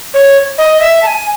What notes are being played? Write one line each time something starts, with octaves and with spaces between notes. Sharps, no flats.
C#5
D#5
E5
A5
G#5